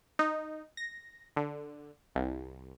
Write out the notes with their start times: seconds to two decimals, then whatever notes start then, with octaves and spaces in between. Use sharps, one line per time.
0.19 D#4
0.77 A#6
1.36 D3
2.15 C2